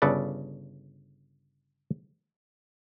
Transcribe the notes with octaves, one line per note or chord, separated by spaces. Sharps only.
G1 C#3 A4 B4 D5